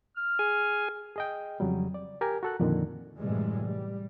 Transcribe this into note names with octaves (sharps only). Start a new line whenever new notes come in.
F6
G#4 G#5
G#4 D#5 G5
F2 C#3 F#3 G3
D5
G4 A#4 G#5
F#4 A4 F#6
F2 A#2 D3 D#3
F#2 A2 C3 E3 G3 G#3
G3